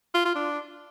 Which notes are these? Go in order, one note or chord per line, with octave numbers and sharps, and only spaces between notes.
F4
F4
D4